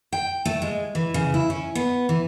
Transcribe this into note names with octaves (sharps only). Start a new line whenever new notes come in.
G5
A3
G#3
E3
C#3
E4
C#4
B3
E3